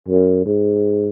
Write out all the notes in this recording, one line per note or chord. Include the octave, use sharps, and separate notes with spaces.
F#2
G#2